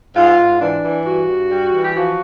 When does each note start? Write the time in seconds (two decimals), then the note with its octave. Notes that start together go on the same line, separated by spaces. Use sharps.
0.15 G#2 F4
0.37 G#2
0.60 E3 D4
0.82 E3
1.05 G2 F#4
1.27 G2
1.50 G3
1.72 E3
1.83 G4
1.94 F3 F#4